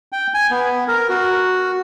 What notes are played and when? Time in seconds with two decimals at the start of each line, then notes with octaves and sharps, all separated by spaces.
0.12 G5
0.34 G#5
0.51 B3
0.88 A#4
1.09 F#4